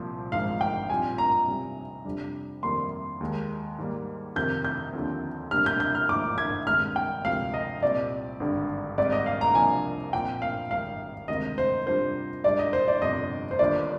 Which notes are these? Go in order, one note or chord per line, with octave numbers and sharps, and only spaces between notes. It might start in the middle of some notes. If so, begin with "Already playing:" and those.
Already playing: C2 A#2 F3 C4 F4
G#1 G#2 F3 G#3 D#4 F5
G5
A#1 A#2 G3 C4 F4 G#5
A#5
C3 G3 C4 D#4
F2 C3 G3 D4
F2 D#3 G3 A#3 C6
D#2 D#3 G#3
G#2 D#3 G3 A#3
F2 C3 D#3 G6
G6
D#2 D3 F3 C4
C3 G3 A#3 D4 G4 F6
G6
G6
F6
G#1 G#2 F3 A#3 D4 D6
G#6
G2 D#3 G#3 C4 F6
G5
D2 C3 F3 G#3 F5
D#5
C2 A#2 G3 C4 D5
G#1 G2 D3
G#1 G#2 G3 C4 D5
D#5
F5
A#5
C2 C3 F3 A#3 D4 G#5
A#2 F3 C4 G5
F5
G#1 G#2 G3 F5
D2 C3 D#3 G#3 C4 D#5
C5
C3 G3 D4 F4 C5
G#2 G3 D4 D5
D#5
C5
D5
G1 F2 C3 D#5
C5
G1 G2 D#3 A#3 F4 D5